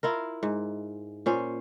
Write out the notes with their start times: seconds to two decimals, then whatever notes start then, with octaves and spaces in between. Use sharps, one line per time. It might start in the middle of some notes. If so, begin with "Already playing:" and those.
0.03 E4 F4 A#4
0.43 G#2
1.26 A#2 C#4 C5